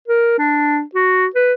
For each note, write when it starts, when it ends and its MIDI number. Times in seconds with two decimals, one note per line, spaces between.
0.08 0.35 70
0.38 0.82 62
0.95 1.27 66
1.35 1.53 71